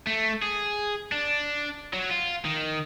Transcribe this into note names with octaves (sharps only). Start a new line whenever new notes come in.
A3
G#4
D4
F#3
F4
D#3